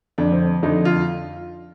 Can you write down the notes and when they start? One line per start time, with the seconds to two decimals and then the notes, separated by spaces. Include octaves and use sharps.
0.18 F2 D3 D4
0.32 C4
0.63 F2 D3 D#4
0.85 F4